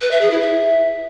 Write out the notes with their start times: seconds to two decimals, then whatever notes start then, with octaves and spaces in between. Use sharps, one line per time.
0.01 B4
0.11 E5
0.21 G#4
0.31 E4
0.41 E5